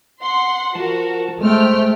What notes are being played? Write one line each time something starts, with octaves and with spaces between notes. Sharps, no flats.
F#5 C6
F3 F#4 A#4 A5
G#3 A3 C5 G5 F6